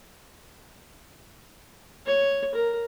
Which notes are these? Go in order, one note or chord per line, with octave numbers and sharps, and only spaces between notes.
C#5
A#4